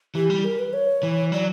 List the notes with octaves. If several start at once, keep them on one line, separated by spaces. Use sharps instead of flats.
E3 G4
G3
A#4
B4
C#5
E3
F#3 D5